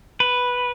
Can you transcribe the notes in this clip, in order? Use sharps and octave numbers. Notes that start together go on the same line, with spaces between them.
B4